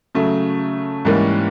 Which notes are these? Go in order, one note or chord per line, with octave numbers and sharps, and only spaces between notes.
C#3 F#3 A3
G#2 E3 G3 A#3 C#4